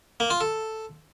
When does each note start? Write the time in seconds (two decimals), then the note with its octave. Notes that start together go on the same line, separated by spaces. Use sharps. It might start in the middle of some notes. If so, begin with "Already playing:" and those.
0.20 A#3
0.30 F4
0.41 A4